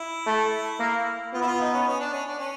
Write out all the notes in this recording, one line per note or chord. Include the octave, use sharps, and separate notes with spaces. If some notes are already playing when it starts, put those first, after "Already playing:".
Already playing: E4
A3
A#3
B3 F4
E4
F4
D#4
C#4
C#4
D4
C#4
D4
C#4